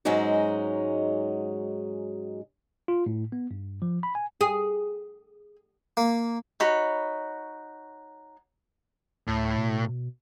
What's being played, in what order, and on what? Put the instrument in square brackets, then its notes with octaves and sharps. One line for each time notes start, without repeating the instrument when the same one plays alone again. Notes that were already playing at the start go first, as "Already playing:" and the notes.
[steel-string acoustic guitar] G#2 F#3 G#3 C#4 D#4 F#4
[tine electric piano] F4
A2
B3
G2
F3
B5
G#5
[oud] G#4
[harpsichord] A#3
[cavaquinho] D#4 F#4 C#5 B5
[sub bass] D2 [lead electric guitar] A2
[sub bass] B2